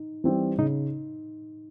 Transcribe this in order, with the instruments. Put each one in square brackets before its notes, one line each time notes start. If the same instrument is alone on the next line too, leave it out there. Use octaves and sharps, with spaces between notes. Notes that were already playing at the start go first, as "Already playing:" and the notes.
Already playing: [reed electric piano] D#4
[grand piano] E3 G3 C4
[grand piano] C#3 [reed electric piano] D#4